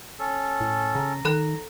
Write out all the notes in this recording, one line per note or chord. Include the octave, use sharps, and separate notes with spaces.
C#4 A4
A2
C#3 A#5
D#3 A4 B5 F#6